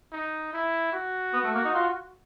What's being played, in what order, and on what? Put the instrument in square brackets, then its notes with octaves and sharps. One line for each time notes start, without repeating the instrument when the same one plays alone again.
[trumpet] D#4
E4
F#4
[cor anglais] B3
A3
A#3
D#4
F4